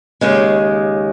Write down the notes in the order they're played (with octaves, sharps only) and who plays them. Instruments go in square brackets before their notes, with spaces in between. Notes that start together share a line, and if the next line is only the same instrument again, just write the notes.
[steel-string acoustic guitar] D#2 C#3 G#3